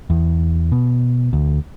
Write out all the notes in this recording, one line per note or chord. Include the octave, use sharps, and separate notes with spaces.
E2
B2
D2